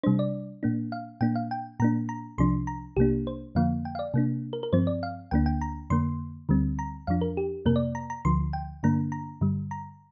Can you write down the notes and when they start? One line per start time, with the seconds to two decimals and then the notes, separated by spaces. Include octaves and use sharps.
0.03 C3 G3 D4 C5
0.19 D5
0.63 A#2 A#3 D4
0.92 F5
1.21 A#2 A#3 D4 G5
1.36 F5
1.51 G5
1.80 A#2 A#3 D4 A#5
2.09 A#5
2.38 C2 C3 F3 D4 C6
2.67 A#5
2.97 C2 C3 A#3 D4 G4
3.27 C5
3.55 F2 D3 F3 A#3 F5
3.85 G5
3.95 F5
3.99 D5
4.14 C3 A#3 D4
4.53 A#4
4.63 A#4
4.73 G2 F3 C4 C5
4.87 D5
5.03 F5
5.31 D2 D3 A#3 D4 G5
5.46 G5
5.61 A#5
5.90 F2 D3 A#3 C6
6.49 D2 D3 G3 C4
6.79 A#5
7.07 F2 F3 D4 F5
7.21 A#4
7.37 G4
7.65 F2 C3 A#3 A#4
7.76 D5
7.95 A#5
8.10 A#5
8.25 D2 D3 F3 C6
8.53 G5
8.83 G2 D3 A#3 D4 A#5
9.12 A#5
9.41 G2 D3 G3
9.71 A#5